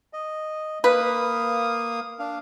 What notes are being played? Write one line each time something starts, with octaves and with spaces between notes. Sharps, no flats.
D#5
A#3 B4 F5 D#6
D4 F5